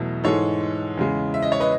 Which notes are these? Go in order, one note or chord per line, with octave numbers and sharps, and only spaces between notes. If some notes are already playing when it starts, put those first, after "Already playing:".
Already playing: E2 B2 F#3 A3
G#2 E3 G#3 A4 C#5
E2 C#3 G#3
E5
D#5
C#5
B4 D#5